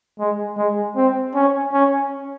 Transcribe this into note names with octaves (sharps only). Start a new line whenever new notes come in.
G#3
G#3
C4
C#4
C#4